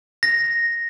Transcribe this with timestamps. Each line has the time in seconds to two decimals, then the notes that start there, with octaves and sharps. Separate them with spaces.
0.23 A#6